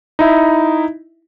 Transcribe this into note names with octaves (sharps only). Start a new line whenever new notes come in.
D#4 E4 E5